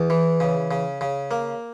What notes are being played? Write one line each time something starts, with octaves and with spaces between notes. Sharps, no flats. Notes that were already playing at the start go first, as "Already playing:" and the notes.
Already playing: E2
E3
C#3
C#3
C#3
A#3